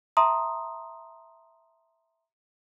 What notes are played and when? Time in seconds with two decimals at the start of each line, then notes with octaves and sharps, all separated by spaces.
0.17 E5 A5 A#5 C6 D#6